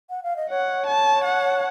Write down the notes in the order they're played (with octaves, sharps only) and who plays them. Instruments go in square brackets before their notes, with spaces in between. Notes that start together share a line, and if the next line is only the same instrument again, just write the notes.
[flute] F#5
F5
D#5
[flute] C#5 [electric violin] F#5
[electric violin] A5
F#5